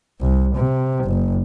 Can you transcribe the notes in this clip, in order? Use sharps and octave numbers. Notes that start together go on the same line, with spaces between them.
C2
C3
F#1